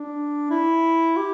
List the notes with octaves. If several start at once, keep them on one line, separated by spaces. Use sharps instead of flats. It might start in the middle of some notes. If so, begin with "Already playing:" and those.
Already playing: D4
E4
G4